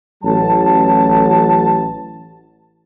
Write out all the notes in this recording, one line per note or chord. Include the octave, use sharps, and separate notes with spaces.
A1 F#3 A5